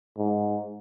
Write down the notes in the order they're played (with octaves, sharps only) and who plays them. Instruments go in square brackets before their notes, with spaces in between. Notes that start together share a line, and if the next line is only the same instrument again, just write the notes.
[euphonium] G#2